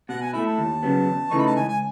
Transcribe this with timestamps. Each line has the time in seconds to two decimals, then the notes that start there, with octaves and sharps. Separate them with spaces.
0.09 B2 F#5
0.21 G#5
0.33 A3 E4 B5
0.46 A5
0.58 D#2
0.83 C#3 F#3 B3
1.07 E2
1.30 C#3 E3 A3 D#4 C#6
1.38 B5
1.47 A5
1.56 C#2 G#5
1.69 G#5